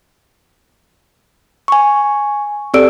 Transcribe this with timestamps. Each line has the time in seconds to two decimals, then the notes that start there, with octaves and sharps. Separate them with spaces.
1.68 G#5 C#6
2.74 C4 G4 A4 D5 E6 D7